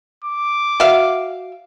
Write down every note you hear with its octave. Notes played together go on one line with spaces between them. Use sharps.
D6
F#4 E5 F5